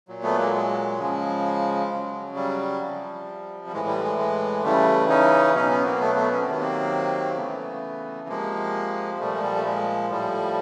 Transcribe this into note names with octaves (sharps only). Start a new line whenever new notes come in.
A#2 F#3
A3 B3
G#3 A#3
G#3
C#3 F3 G#3
C#3 F#3
G3
C3 F3
G3
A2 E3 G#3
G3
G#3
G#3
C#3 E3 G3 A3
C#4 D#4
B2 F#3 C#4 D#4
B3 C#4
A#3 C4
A3 B3
A3 B3
C#4
C4
C3 D#3 F#3 B3
A#3 C4
C#3 E3 A3 B3
C3 F3 G#3 A#3
A#2 F3 G3 A3
G#3
G3
A3
G#3
A2 F3 G3